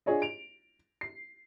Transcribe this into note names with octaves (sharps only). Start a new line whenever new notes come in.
D4 F4 G#4 C#5 D#5
D7 F7
C7